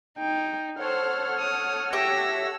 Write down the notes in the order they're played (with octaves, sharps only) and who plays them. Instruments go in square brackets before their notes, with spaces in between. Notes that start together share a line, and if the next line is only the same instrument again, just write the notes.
[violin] D#4 [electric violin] G5
[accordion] A4 C#5 F#5 [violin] C5 [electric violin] F6
[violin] D#6
[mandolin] G4 E5 [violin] E6 [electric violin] A#6